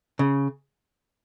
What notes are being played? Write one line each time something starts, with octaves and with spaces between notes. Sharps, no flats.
C#3